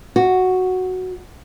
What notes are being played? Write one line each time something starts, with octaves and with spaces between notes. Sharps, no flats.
F#4